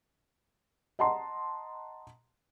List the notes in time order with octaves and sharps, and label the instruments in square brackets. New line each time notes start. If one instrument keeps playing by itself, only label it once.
[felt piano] D#5 F#5 A5 A#5 C6